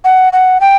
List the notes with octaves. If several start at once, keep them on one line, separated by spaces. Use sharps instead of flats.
F#5
F#5
G5